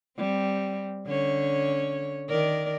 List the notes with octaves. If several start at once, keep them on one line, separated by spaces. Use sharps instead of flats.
G3 C4
D3 C#4 C#5
D#3 A#4 D5